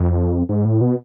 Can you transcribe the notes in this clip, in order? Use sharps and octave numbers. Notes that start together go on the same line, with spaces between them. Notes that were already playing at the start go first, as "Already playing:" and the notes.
Already playing: F2
G#2
A2
B2